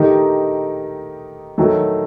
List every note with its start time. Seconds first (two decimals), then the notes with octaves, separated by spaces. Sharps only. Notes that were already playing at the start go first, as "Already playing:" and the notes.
Already playing: D#3 A3 D#4 G4
1.58 D#3 F#3 A3